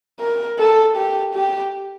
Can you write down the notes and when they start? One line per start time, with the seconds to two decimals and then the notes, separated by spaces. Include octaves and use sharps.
0.20 A#4
0.59 A4
0.96 G4
1.34 G4